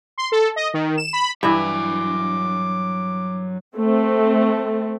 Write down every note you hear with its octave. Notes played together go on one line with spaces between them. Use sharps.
C6
A4
D#5
D#3
E7
B5
G2 E3 F#3 E5 D6
A3 C4